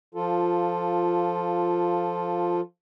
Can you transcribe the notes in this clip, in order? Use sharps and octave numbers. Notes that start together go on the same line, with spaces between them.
F3 F4 A4